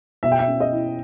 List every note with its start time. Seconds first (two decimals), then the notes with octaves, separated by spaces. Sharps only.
0.23 B2 E5
0.32 G5
0.39 E5
0.48 C#4
0.60 D#5
0.73 E4